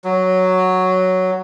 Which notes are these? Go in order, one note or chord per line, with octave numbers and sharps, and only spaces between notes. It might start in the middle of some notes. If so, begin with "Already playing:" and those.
F#3